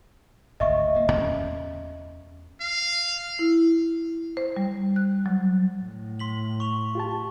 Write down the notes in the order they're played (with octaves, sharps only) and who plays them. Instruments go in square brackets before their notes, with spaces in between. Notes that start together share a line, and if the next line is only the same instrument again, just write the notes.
[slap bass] G#1 D2 [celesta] D#5 E5 C#6
[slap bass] D1 A#3
E2 C#4
[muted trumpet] F5
[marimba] E4
C5
G3
F#6
F#3
[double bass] A2
[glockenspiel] C6 B6 F#7
C#6 F7
[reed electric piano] F4 G4 A5